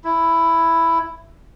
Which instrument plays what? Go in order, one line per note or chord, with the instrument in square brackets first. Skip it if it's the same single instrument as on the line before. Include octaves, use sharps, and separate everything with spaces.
[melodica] E4